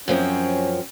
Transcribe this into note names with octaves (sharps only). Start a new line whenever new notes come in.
F#2 F3 C4 C#4